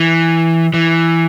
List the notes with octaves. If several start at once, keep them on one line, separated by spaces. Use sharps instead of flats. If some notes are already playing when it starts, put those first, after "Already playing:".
Already playing: E3
E3